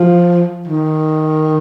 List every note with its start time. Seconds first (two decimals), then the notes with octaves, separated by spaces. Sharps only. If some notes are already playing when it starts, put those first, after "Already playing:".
Already playing: F3
0.67 D#3